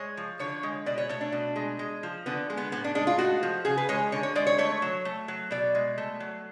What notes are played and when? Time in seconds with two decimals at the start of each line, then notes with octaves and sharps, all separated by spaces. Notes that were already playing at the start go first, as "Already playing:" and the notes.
Already playing: G#3 C#5
0.17 F3
0.39 D3 C#5
0.63 G#3
0.86 B2 D5
0.98 C#5
1.09 A3 C#5
1.21 D4
1.32 B2
1.56 G#3
1.79 G#3
2.03 F3
2.26 D3 B3
2.50 G#3
2.57 B3
2.72 A2 B3
2.84 D4
2.95 G#3 D4
3.07 F4
3.19 A3 F#4
3.43 F3
3.65 C#3 G#4
3.78 B4
3.89 G#3 C#5
4.12 D3 C#5
4.23 C#5
4.35 G#3 D5
4.47 C#5
4.58 A3 C#5
4.82 F#3
5.05 A3
5.28 F#3
5.51 B2 D5
5.75 G#3
5.98 A3
6.20 F#3